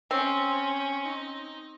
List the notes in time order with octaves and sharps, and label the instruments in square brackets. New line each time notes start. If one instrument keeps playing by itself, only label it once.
[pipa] C4 [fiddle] C#4
[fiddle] D#4